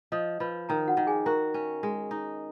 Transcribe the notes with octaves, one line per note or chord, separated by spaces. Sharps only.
F3 D#5 D#6
F3 B4 B5
D#3 A#4 A#5
F#4 F#5
D#3
G#4 G#5
F#4 A#4 A#5
C#4
G#3
D#4